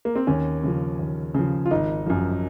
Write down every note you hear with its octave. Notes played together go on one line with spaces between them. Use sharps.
A#3
C4
D#2 C#4
C#3 F3
D#2
C#3 F3
F4
G#1 D#4
F#2 F3